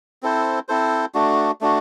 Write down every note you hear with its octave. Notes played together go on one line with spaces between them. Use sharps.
C4 E4 A4 C5
C4 E4 A4 C5
A3 D4 F#4
A3 D4 F#4